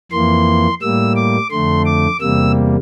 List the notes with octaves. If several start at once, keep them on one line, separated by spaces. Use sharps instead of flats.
F2 E3 A#3 C6
A2 G3 A#3 E6
D6
F2 D3 A3 C6
D6
E2 C3 G3 A#3 E6